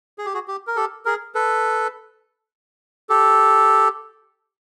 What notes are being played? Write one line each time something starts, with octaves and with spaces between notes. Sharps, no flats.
G#4
G4
F#4 G#4
G4
A#4
G4 A4
G#4 A#4
A4 B4
G4 A4